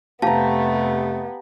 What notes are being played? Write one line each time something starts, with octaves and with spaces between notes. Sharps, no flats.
F2 C3 A3 B3 G4 F5 A5 A#5